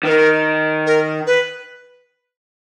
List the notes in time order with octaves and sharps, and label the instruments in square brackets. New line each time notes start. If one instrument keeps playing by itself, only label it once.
[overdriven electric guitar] D#3 [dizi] B4
[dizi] A#4
A#4
B4